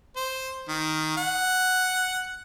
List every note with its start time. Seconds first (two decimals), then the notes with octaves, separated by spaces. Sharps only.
0.16 C5
0.69 D#3
1.17 F#5